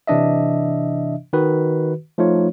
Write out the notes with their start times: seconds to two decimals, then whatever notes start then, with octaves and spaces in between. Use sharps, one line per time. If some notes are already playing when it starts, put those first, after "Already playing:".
0.07 C3 E3 D4 D#5 E5
1.33 D#3 F#4 B4
2.18 F3 A3 D#4 F4 C#5